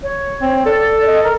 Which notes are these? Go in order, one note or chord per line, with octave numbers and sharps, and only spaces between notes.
C#5
C4
A4 D5
D#5
A#4